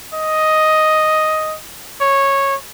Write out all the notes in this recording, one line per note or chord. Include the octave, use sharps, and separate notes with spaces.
D#5
C#5